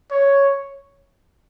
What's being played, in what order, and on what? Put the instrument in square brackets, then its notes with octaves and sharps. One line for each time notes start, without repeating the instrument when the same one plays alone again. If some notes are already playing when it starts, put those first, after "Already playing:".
[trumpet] C#5